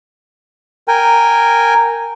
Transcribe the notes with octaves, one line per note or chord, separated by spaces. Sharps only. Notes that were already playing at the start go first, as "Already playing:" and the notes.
A#4 G5 G#5